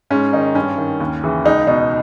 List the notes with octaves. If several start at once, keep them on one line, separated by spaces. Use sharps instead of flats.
G#2 C#4
D#3 D#4
G2 C#4
D#3
D#2
C#3 E3
C#2 D#4
B2 D#4